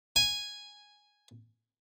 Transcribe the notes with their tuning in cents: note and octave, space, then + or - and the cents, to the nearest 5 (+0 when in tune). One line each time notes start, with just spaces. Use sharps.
G#5 -5